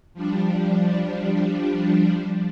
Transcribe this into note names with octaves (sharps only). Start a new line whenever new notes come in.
F3 G3 D4